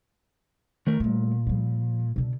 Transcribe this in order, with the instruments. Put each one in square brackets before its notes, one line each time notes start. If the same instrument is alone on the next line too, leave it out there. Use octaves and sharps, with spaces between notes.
[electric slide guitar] D#3 A3 A#4
[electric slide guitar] A#2 [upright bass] G3 A3
[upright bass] F3 G3
B2 D3